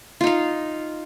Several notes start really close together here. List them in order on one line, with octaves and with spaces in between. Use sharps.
F4 D#4 F5